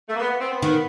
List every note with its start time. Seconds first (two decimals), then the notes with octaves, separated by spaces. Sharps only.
0.09 A3
0.15 A#3
0.19 B3
0.31 B3
0.40 C4
0.51 B3
0.62 D#3 B3